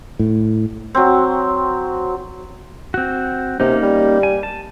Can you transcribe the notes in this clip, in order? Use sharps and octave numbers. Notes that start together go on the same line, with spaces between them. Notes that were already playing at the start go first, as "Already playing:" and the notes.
A2
F#3 C4
C4 F#4
C3 A#3 C#4 D#4
G3
G#5
A5